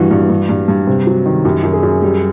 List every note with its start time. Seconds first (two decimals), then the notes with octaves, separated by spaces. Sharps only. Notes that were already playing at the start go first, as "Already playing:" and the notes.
Already playing: G2 E3 F#4
0.11 G2
0.29 G2
0.49 G2
0.68 G2
0.87 C3
1.07 F#3
1.26 D#3
1.45 F#2 G4
1.63 F#2
1.73 G#4
1.83 F#2
2.02 G3